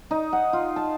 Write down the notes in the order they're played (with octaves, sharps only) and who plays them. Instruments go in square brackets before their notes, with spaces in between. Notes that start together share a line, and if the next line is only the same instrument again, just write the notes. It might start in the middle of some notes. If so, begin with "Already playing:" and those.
[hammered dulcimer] D#4
F#5
F4
A5